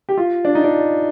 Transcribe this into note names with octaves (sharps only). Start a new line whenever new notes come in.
G4
F4
D4
D#4
D4